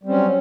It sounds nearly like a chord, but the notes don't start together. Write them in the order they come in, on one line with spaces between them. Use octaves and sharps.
G3 C4 C#4 F#3